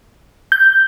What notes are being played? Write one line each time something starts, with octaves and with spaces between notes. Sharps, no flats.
G6